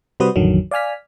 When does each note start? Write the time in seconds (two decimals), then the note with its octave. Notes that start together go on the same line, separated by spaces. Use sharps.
0.20 C3 G3 F#4 B4 C5 D#6
0.36 A1 F2 D3 D#3 F#3
0.71 D5 F5 G#5 F6 B6